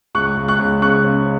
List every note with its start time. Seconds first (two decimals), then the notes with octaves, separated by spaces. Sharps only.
0.15 C#2 C#6 F#6
0.37 C#2
0.48 C#6 F#6
0.59 C#2
0.82 C#3 C#6 F#6
1.04 C#3